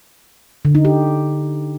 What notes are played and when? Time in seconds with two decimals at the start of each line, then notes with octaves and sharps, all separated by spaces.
0.65 D3
0.75 D#4
0.85 G4